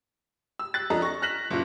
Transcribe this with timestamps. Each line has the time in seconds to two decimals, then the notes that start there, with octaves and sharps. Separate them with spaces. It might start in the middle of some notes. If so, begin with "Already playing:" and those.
0.59 E6
0.74 F#6 A6
0.90 F2 D4 A4 D#5 A#5
1.02 C#6 A#6
1.22 F6 F#6 A#6 B6 E7 F#7
1.50 F#1 A#2